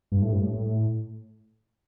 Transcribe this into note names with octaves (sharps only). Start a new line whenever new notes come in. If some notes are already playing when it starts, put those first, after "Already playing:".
G2
A2
G2
A2
A2